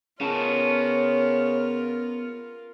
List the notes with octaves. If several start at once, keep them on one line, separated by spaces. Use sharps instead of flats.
C#3 B3 F4 A#4 C#5 A5